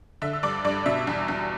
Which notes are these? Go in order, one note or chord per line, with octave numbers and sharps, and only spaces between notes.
D3 E5 E6
E6
G2 D5 D6
G2 D5 D6
B2 E5 E6
E2
E2